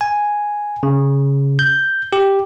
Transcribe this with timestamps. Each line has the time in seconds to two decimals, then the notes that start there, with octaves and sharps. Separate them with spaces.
0.01 G#5
0.83 C#3
1.59 G6
2.13 G4